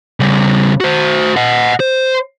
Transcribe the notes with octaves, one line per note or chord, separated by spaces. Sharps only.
C#3 G3
F#4 C5
D#5 F#5
C5